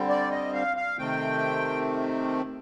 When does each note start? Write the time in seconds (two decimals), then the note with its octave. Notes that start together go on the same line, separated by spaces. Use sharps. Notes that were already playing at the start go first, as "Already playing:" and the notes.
Already playing: D3 G3 C4
0.09 D5
0.31 D#5
0.54 F5
0.77 F5
0.99 C3 D#3 A3 C4 G5